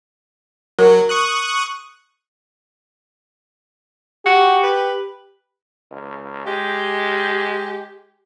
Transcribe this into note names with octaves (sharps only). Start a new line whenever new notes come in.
F#3 A#4
C#6 D#6 F#6
F#4 G4
B4
C#2
G#3 G4